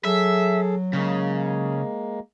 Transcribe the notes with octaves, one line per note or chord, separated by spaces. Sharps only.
F#3 G#4 A4 E5
C#3 G#3 A#3